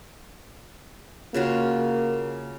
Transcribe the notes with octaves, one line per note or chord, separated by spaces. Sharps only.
C#3 A#3 F4 F#4